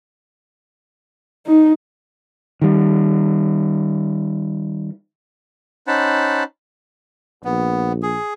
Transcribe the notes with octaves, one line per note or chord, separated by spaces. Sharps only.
D#4
D#3 G3
C#4 D#4 C5 F#5 A5 B5
A#1 B3
G#4